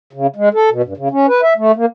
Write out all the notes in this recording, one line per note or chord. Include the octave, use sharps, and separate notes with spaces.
C#3
G#3
A4
B2
G2
C#3
C#4
B4
E5
A3
A#3